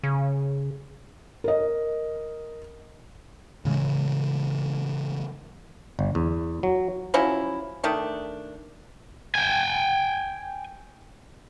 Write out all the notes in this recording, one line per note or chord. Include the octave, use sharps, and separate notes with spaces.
C#3
A#4 D#5
A2 C#3 E3 G#3
G1
E2
F#3
F3 F#3 C#4 E4
D#3 A3 D4
G5 G#5